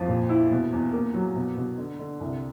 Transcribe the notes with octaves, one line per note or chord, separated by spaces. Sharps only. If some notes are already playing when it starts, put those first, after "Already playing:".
Already playing: F2 F3
A#2
E4
B2
E2
A#3
F#3
B2
B2
D3
D3
C2